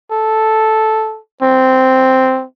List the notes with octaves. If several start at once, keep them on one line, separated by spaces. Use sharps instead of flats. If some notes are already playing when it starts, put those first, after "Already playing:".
A4
C4